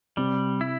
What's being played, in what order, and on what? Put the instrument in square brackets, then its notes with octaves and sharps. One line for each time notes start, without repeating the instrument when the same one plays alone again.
[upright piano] C3 [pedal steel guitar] G3
[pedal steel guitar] E4